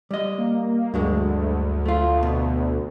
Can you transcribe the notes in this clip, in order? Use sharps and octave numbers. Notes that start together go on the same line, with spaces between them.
G3 D#5
A#3
D2 G2 F#3 G#3
A3 F4
B2